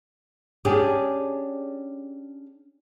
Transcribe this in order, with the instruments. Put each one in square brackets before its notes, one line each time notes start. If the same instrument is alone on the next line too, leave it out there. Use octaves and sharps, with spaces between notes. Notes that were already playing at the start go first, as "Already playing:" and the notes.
[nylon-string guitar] C#4 D4 G4 G#4